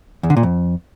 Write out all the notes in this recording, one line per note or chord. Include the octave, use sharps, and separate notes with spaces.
E2
D3
A#2
F2